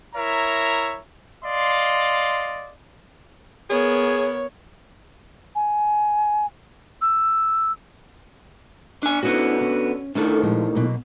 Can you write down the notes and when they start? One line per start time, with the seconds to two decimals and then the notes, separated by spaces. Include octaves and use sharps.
0.16 E4 A#4 C#5 E5 A#5
1.44 D5 D#5 F5 C6
3.70 B3 G#4 A#4 C#5
5.55 G#5
7.02 E6
9.03 D4 G#5
9.23 D3 B3 C#4 D#4 E4 F#4
9.61 C#4
10.15 D2 A2 D#3 D4 D#4 A4
10.43 A#2 F3 G#3
10.75 B2 F#3 A#3